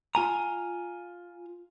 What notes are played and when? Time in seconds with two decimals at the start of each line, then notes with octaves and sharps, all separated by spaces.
0.15 F4 G#5 A#5